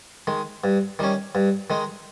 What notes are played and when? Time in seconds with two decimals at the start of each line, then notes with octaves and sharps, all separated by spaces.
0.27 D#3 G#3
0.64 G2
0.99 D#3 G3 C#4
1.35 G2
1.70 D#3 G#3 D#4